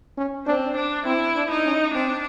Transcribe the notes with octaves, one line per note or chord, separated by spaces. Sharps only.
C#4
C4 D4
D4
C4 E4
D4
D#4
C#4
C4 D4